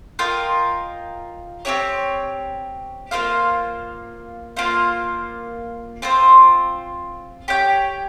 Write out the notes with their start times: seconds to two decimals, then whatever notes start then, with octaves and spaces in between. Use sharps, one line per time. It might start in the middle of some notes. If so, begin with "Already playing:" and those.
0.19 F4 A#4 D#5 G5
1.65 C4 D#4 G4 C#5
3.11 A#3 F4 C5 F5
4.56 A#3 F4 C5 F5
6.02 C4 F4 C5
7.48 G4 C#5 G5